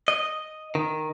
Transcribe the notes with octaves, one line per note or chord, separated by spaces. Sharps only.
D#5
D#3